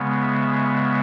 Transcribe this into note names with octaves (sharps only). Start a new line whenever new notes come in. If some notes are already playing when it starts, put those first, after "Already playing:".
Already playing: C#3 G#3 B3
E5
E5